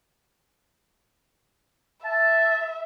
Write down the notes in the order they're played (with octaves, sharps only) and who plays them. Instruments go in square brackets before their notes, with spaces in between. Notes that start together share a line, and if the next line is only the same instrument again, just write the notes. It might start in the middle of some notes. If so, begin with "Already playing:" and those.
[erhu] E5 [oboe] A5